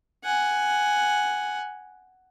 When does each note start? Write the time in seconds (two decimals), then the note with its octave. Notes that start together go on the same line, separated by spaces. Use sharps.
0.24 F#5 G#5